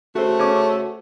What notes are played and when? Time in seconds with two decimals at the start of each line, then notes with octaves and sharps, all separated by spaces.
0.15 C#3 A3 F#4 C5
0.39 C#4 D6